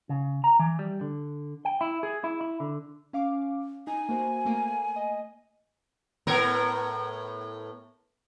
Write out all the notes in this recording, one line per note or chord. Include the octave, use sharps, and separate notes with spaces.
C#3
A#5
E3
G3
D3
G5
E4
G#4
E4
E4
D3
C#4 F5 D6
D#4 G#5
A#3 F#4 C5
A3 A#3
D#5
A2 B3 A#4